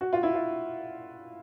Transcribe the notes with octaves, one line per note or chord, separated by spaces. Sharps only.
F#4
F4
E4
F4